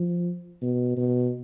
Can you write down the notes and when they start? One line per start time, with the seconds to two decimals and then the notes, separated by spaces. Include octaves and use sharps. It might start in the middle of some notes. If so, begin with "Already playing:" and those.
Already playing: F3
0.62 B2
0.97 B2